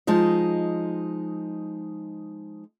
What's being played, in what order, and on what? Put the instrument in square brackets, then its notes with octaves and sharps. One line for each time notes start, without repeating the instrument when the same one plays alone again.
[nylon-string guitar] F3 G#3 D#4 D#5